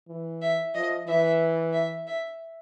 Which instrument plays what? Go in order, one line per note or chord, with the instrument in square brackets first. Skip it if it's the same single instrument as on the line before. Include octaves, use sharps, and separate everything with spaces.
[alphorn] E3
[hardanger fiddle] E5
[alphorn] F3 [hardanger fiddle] D#5
[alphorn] E3 [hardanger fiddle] E5
[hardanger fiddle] E5
E5